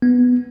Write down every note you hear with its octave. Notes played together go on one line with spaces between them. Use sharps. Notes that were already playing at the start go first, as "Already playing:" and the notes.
B3